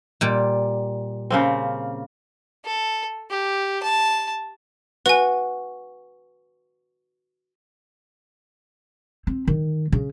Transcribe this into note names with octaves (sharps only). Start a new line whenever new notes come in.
A#2 G3
C#3 A#3 C4
A4
G4
A5
F#4 B4 G#5
C4
D#3
C#3